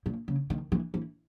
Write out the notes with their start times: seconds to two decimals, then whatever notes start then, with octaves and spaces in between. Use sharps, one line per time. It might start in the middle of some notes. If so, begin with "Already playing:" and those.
0.06 A#2
0.28 C#3
0.50 D#3
0.72 E3
0.94 E3